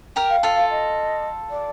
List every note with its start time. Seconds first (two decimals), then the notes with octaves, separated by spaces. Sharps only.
0.16 G4 A#4
0.30 F5
0.43 F4 A4
0.56 F5
0.70 D#5
1.51 D5